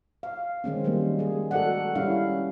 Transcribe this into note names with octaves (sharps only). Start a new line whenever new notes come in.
F5
D#3 G#3 C4 C#4
D#3 F#3 G3 A#3
G#3 G#4
F#4 A4 A#4 D5 F#5
G3 C#4 E4 F5